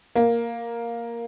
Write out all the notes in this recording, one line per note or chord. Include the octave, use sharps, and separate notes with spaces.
A#3